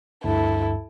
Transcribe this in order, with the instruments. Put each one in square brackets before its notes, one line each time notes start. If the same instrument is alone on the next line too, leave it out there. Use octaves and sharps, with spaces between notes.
[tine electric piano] D2 G2 [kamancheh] E4 A4